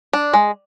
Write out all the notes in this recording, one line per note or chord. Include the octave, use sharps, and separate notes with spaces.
D4
G#3